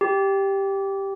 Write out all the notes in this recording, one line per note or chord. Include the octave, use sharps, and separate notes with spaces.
G4